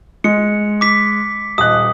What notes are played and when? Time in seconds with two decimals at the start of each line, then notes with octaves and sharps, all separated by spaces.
0.24 G#3 C#7
0.81 D6 B6
1.58 D#1 D#5 D#6 F#6